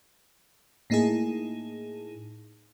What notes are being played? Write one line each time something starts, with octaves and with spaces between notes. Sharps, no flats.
A2 A#3 D#4 E4 G#4